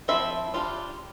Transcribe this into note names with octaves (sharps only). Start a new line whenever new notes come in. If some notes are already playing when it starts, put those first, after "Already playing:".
F3 C4 E4 E5
G3 D4 F4